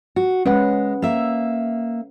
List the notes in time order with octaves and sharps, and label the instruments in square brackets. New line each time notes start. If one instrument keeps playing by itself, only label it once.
[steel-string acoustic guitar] F#4
[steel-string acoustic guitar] G#3 [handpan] C#4 B4 F#5
[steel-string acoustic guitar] A#3 E5